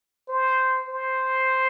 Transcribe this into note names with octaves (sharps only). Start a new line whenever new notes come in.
C5
C5